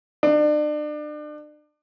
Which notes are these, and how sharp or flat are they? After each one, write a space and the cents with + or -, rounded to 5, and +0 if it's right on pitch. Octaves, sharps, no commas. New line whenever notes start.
D4 +35